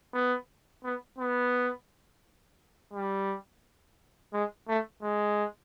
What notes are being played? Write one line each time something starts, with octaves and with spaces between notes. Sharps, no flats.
B3
B3
B3
G3
G#3
A3
G#3